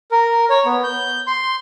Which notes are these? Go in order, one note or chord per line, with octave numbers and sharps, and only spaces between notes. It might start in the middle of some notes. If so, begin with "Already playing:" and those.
A#4
C#5
B3
G6
C6